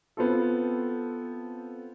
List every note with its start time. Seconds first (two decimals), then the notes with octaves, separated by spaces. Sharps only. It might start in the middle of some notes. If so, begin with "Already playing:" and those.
0.17 B3 C4 F4 A4